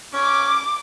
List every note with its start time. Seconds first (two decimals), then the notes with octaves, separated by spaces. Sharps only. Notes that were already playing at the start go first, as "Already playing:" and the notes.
0.13 C#4 D6